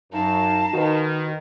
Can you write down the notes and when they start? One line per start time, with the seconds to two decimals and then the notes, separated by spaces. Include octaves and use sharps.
0.13 F#2 D#4 F5 A5 A#5
0.73 D#3 D#4 F#4 B4